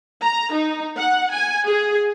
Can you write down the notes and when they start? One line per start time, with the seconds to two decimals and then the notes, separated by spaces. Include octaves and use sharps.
0.24 A#5
0.54 D#4
0.97 F#5
1.32 G#5
1.65 G#4